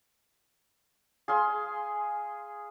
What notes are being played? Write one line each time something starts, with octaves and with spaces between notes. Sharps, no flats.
G#4 F5 C6